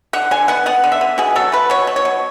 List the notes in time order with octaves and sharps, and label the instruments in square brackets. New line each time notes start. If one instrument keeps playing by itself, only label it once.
[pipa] D3 F#5
D3 G#5
B3 F#5
B3 F#5
D3
E5
D3
B2 G#4
F#3 A4
A3 B4
B2 C#5
F#3
C#5
B2